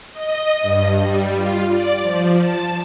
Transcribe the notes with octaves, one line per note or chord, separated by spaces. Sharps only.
D#5
G2
G3
F4
D5
F3
A5